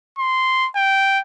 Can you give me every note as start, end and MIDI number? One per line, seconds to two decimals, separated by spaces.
0.19 0.68 84
0.76 1.20 79